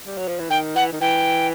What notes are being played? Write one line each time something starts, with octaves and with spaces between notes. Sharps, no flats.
G3
F#3
F3
E3
D#3 G5
E3 F#5
D#3
E3 G5